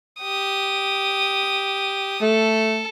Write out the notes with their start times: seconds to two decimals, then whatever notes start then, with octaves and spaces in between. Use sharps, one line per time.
0.21 G4 D#6
2.22 A3 A4